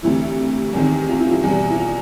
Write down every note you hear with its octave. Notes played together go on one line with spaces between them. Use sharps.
D2 C3 E3 E4
E2 C3 D#3 G#3
F4
E4
F4
E4
E2 B2 G3
E4
F4